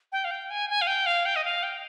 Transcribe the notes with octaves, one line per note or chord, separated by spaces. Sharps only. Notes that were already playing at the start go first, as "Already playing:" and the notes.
G5
F5
G5
G#5
G#5
F5
G5
F5
G5
D#5
F5
G5